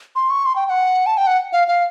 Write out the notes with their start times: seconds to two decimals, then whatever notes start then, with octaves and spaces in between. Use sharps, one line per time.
0.16 C6
0.30 C#6
0.45 C6
0.56 G5
0.66 G5
0.70 F#5
1.06 A5
1.17 G5
1.27 F#5
1.53 F5
1.68 F5